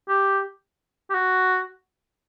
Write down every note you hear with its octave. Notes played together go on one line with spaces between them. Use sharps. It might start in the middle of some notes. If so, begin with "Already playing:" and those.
G4
G4
F#4